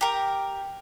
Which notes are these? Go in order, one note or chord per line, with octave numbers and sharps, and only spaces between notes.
G4 A#4